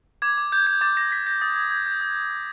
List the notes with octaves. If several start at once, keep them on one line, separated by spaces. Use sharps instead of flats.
D6 G#6
D6
G6
G6 G#6
D6 A6
D6 A#6
G6 B6
G6 A#6
D#6 A6
D#6 G#6
G6 G#6
G6
D#6
D#6
G6